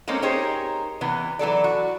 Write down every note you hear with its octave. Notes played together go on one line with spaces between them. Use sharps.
G#3 A#3 C4 C#4 D#4 A4
D#4 G4 G#4 A#4 C5 C#5
C3 E3 B3
E3 F#3 A4 D5
F#4